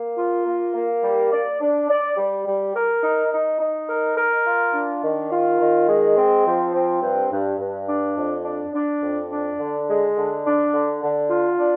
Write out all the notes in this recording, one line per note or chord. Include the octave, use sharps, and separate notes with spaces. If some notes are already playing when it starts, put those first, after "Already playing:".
Already playing: A#3
F4
A#3
A#3
G3
D5
D4
D5
G3
G3
A#4
D#4
D#4
D#4
A#4
A#4
F4
D4
D#3
F4
D#3
G#3
C4
F3
C4
G2
G2
G2
D4
F2
D4
D4
F2
D4
D3
G#3
D3
D4
D3
D3
F4
D4